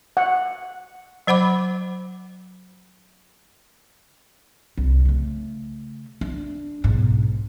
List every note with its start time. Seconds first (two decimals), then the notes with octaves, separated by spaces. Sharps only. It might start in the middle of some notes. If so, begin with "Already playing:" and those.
0.17 F#5
1.27 F#3 C5 F#5 B5 D6
4.78 C2
5.05 C#3 A3
6.21 D4
6.84 B1 G#2